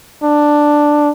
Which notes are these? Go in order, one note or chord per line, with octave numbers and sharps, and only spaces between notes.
D4